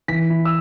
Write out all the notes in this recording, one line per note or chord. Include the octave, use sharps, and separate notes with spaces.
E3 B6
E4
E6